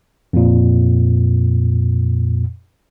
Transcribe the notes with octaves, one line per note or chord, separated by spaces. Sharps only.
F2 A#2